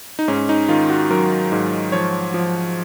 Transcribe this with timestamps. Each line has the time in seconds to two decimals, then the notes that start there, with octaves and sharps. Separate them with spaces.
0.19 D#4
0.28 G#2 C#4
0.49 D#4
0.69 D#3 F4
0.90 F#4
1.10 F#3 A#4
1.52 G#2
1.92 F3 C#5
2.34 F3